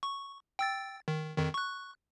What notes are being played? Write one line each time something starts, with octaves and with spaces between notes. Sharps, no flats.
C#6
G5 E6 A6
D#3
F2 D#3
C#6 F#6